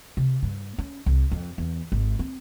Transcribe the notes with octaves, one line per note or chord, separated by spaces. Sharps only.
C3
G2
C#4
C2
F2
E2
G#1
C4